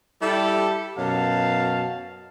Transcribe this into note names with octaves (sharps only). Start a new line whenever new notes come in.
G3 E4 G4 A4
F#2 B2 F#3 F5 A5